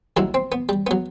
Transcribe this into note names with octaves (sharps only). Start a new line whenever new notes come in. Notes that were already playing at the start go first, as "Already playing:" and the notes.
D#2 D#3 F#3 E4
C4
B3
G3
F#3 B3